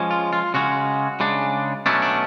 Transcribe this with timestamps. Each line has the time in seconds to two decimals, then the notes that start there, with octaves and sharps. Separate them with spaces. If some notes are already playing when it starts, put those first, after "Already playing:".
Already playing: F3 G#3 C#4
0.11 F4
0.33 F4
0.54 C#3 G#3 C#4 F#4
1.20 C#3 G#3 D4
1.86 B2 F#3 A3 C#4 D4
2.02 D4